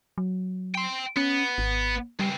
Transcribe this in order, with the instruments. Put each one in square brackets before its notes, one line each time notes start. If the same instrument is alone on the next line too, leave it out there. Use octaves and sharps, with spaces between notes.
[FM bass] F#3
[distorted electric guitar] G5 C6
[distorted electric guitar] B3 [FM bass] C#4
[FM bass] G#1
[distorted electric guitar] C#2 C4 [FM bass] G3